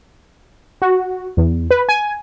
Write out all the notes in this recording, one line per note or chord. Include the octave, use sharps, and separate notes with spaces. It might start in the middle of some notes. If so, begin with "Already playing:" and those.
F#4
E2
B4
G#5